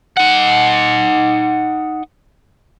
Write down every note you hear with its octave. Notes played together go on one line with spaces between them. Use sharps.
D#4 F#5